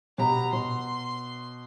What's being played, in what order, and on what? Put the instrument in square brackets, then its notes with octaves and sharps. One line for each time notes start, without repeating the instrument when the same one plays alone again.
[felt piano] B2 G4 B5 [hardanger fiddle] A#5
[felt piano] B2 [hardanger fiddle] C6